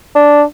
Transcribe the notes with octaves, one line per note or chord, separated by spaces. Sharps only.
D4